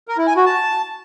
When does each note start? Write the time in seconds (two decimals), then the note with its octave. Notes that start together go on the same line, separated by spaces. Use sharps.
0.08 A#4
0.18 E4
0.27 G#5
0.36 F#4
0.46 A5